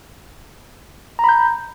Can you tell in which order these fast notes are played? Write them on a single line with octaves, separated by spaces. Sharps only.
A#5 B5 G6